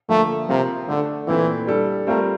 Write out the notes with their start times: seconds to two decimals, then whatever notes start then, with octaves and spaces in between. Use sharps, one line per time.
0.09 D3 F3 A3 A#3
0.49 C3 F3 C4 F4 A#4
0.88 D3 A3 D4 A4
1.27 A#2 E3 A3 C4 E4
1.67 G3 D4 A4
2.07 G3 A3 C4 F4 A#4